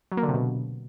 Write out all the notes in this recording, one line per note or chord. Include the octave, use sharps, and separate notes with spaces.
F#3
A#3
D3
C3
B2